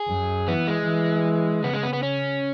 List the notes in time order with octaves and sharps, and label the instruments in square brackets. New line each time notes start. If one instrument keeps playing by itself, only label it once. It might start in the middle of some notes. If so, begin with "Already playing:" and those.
Already playing: [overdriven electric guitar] G#4
[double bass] F#2
[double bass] E3 [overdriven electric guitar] B3
[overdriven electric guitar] G#3
[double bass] E3
[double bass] C#3 [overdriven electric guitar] B3
[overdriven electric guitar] G#3
B3
B3
C#4